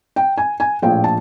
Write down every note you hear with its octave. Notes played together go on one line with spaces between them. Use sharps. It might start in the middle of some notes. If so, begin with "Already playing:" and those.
G5
G#5
G#5
A#1 A2 F3 G5
A5